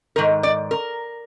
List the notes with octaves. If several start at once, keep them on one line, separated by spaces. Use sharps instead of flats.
G#2 D#3 A#4
D5
A#4